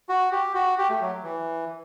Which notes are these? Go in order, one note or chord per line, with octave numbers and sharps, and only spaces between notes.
F#4
G4
F#4
G4
A3
F#3
E3